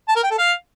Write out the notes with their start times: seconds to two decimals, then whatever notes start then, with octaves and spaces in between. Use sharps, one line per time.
0.09 A5
0.16 A#4
0.23 G5
0.31 A4
0.38 F5